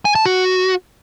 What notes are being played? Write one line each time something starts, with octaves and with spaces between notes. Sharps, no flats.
G#5
A5
F#4